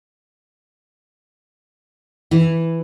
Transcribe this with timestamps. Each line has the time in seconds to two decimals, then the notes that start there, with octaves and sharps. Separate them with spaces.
2.31 E3